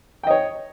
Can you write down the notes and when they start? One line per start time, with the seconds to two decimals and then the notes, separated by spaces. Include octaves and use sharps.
0.23 G5
0.27 D#5
0.30 C#5